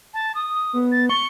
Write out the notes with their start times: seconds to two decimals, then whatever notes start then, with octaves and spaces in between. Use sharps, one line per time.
0.14 A5
0.35 D#6
0.73 B3
0.92 A6
1.09 C#6 G7